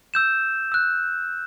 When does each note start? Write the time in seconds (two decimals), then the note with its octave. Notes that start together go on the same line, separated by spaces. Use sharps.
0.14 E6 G6 E7
0.72 E6 F#6